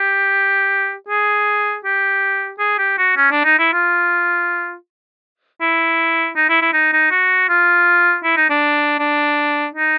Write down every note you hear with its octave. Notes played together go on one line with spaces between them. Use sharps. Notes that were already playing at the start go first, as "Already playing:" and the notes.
Already playing: G4
G#4
G4
G#4
G4
F#4
C#4
D4
D#4
E4
F4
E4
D#4
E4
E4
D#4
D#4
F#4
F4
E4
D#4
D4
D4
D#4